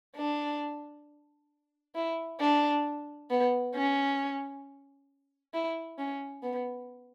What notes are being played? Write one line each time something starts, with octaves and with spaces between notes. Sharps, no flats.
D4
E4
D4
B3
C#4
E4
C#4
B3